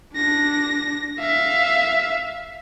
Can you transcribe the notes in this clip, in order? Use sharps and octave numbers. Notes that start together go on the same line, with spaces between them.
D4 A#6
E5 F5